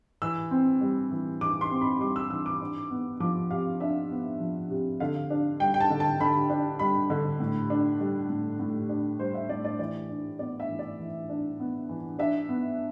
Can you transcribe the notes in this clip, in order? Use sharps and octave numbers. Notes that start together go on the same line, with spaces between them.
E3 E6
C4
G3
E3
E3 D6
C6
C4
B5
G3 D6
E6
E3 E6
D6
D4
B3
F3 D6
C3 F5
D4 E5
B3
F3
C3
D3 F5
D4
G3 G5
G5
A5
D3
A5
D3 B5
D4
G3 B5
D3
A2
D4
G3
A2
A2
D4
G3 C5
E5
A2 D5
D5
E3 D5
D4
B3 D5
E5
E3
D5
E3
D4
B3
E3
D4 E5
B3